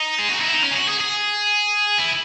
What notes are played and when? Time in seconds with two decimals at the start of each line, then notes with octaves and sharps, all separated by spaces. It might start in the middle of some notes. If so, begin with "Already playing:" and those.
Already playing: D#4
0.19 G#4
0.30 F#4
0.41 E4
0.52 D#4
0.63 C#4
0.71 G#4
0.75 F#4
0.88 G#4
1.00 G#4
1.99 E4